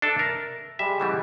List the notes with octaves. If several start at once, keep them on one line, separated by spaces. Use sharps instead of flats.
D4 A4 E5 A5
A#4
G3 G#3 E5
C#3 E3 G3 E5 F#5